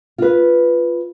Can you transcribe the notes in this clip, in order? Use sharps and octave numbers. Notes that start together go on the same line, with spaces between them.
F4 B4